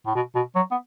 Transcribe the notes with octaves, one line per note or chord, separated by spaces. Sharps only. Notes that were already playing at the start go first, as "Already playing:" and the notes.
A2
B2
B2
F#3
B3